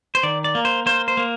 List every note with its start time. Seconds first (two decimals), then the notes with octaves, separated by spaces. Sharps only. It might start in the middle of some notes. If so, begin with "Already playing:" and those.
0.15 C5
0.23 D#3 D5
0.44 D5
0.55 A#3
0.65 C5
0.86 A#3 C5
1.08 C5
1.17 A#3